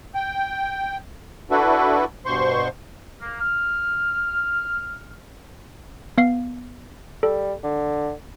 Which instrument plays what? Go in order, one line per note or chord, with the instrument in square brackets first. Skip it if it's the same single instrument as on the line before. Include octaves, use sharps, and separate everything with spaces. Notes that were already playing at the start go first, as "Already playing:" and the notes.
[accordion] G5
D4 E4 F#4 A4 B4
G2 B2 C5 C6 C#6
[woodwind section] A#3
F6
[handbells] B3 F5 C7
[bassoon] G3 [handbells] A4
[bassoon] D3